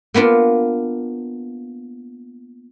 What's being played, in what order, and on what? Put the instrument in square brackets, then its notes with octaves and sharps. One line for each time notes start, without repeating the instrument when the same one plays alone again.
[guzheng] A#3 B3 D4 F4